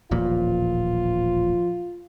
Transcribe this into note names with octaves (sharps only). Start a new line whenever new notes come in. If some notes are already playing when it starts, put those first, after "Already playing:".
D#1 A1 A#2 F3 F4